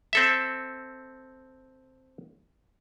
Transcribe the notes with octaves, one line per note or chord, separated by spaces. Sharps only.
C4 A4 E5